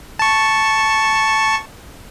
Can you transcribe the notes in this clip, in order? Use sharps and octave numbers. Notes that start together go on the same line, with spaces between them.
A5 C#6